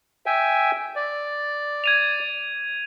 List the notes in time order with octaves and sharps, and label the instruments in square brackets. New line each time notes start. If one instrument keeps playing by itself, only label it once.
[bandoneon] E5 G5 G#5
D5
[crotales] G#6 D#7 F7